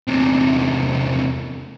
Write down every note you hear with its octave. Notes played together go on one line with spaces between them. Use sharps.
E2 C3